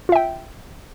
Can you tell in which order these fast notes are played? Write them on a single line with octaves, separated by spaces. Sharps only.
F4 E5 G5